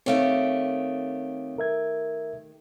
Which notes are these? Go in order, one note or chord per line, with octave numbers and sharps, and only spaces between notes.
D#3 A3 C4 G4 C#5 F5
A#4 E5 G#6